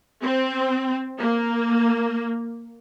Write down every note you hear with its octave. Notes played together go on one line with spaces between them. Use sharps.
C4
A#3